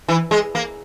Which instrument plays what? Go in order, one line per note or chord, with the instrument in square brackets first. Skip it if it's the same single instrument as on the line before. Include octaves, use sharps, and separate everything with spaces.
[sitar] E3
G#3
A#3